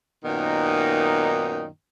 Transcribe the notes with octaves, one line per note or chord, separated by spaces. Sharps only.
F#2 A#2 D#3 B3 D#4